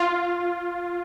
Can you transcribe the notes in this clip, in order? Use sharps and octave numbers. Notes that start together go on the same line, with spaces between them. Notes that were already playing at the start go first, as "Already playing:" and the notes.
Already playing: F4